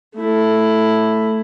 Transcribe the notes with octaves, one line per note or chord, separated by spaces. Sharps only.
A3 E4